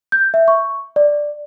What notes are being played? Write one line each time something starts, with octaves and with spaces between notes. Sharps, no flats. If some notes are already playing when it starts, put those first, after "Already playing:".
G6
E5
C#6
D5